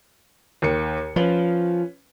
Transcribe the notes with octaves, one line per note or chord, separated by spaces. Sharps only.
D#2 D#3 C#7
F3 C#4 B4